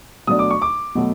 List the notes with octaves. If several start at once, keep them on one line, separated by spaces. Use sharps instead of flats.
B2 F#3 A3 D4 D#6
D6
C#6
D6
B2 F#3 A3